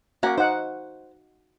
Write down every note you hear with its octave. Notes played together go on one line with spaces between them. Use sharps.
A#3 C#4 F#4 F5 F#5 D6
D#4 C5 F#5